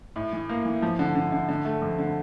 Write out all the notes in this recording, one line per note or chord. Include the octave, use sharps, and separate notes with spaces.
A2
E3
A#3
E3
F3
D3
D3
D3
D3
A3
F2
D3